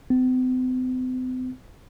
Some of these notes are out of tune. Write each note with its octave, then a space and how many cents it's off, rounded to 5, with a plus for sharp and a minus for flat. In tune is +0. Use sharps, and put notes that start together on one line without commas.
C4 -45